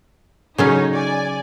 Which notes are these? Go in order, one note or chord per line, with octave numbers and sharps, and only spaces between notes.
C#3 F#3 C#4 D#4 C#5
D5 G#5